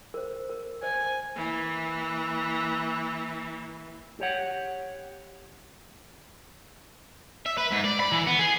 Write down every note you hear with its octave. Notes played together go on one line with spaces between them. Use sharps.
A#4 C5
A#4
C5 D#5 G#5
E3 A#3
G4 C#5 F#5
E5
B4
G#2
D5
B5
E3
B3
G#4